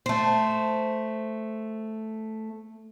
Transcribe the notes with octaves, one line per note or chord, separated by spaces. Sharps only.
A3 C5